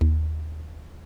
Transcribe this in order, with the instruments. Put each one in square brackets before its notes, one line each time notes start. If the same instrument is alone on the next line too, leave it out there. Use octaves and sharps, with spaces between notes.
[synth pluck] D#2